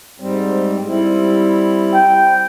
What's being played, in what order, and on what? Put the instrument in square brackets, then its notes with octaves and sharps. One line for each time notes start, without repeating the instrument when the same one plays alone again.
[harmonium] G#2 G3 C4
G3 C4 E4
[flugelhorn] G5